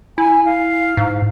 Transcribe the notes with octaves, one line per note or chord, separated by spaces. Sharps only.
E4 G#5
F5
G#2